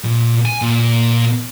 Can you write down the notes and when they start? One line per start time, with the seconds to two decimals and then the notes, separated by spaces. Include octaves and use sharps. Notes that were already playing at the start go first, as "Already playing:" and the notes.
0.04 A#2
0.45 G#5
0.62 A#2